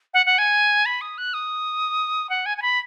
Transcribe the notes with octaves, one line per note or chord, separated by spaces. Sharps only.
F#5
F#5
G#5
B5
D#6
F#6
D#6
F#5
G#5
G#5
B5